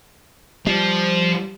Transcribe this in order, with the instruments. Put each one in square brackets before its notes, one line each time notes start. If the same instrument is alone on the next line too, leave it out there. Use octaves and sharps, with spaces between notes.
[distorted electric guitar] F3 [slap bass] G3